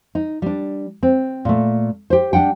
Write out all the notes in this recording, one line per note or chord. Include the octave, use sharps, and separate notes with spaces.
D#4
G3 D4
C4
A#2 A3
G4 C5
G3 D4 F#5 G5